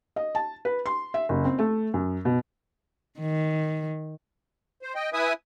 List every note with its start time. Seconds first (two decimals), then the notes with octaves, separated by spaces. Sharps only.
0.16 D#5
0.35 A5
0.65 B4
0.86 C6
1.14 E5
1.29 F#1
1.45 C4
1.59 A3
1.94 F#2
2.25 B2
3.20 D#3
4.82 C5
4.95 D#5 G5
5.13 E4 B4 E5 G#5 D#6